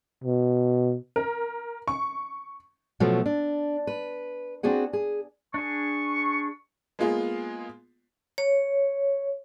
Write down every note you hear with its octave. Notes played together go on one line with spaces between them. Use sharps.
B2
A#4
C#6
B2 F3 F#3 A3 B3
D4
B4
C4 D4 F#4 G#4 F#5
G#4
D4 G#4 C#6
G#3 A#3 B3 F4 G#4
C#5